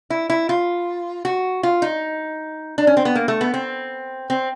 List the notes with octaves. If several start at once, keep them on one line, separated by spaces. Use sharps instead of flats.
E4
E4
F4
F#4
F4
D#4
D4
C#4
C4
B3
A#3
A3
B3
C4
C4